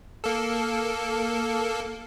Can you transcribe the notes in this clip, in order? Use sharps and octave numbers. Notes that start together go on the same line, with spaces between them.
A#3 A4